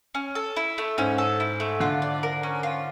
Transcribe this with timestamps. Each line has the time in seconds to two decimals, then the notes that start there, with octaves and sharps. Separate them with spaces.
0.15 C#4
0.35 A4
0.56 E4
0.78 A3
0.98 G#2 C#4
1.18 A4
1.40 E4
1.60 A3
1.80 D3 F4
2.02 D5
2.23 A#4
2.43 C#4
2.63 F4